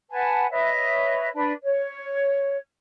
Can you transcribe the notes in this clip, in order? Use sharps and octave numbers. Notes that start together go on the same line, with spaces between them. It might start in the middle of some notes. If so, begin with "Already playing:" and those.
B4 F#5 G#5 A5
B4 C#5 D#5 E5
D4 B4
C#5